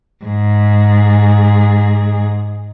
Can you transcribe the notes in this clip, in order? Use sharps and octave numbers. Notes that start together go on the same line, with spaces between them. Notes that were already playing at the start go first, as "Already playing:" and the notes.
G#2 G#4